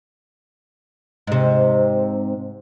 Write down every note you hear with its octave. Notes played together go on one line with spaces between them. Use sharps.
G#2 C3